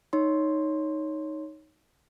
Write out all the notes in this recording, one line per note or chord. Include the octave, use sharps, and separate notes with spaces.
D#4 C#5 C6